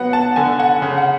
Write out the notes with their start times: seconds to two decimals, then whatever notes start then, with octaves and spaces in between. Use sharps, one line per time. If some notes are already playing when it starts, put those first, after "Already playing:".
Already playing: F#3 B3 F#5
0.13 A5
0.36 D3 G#5
0.60 F#5
0.82 C#3
0.98 F#5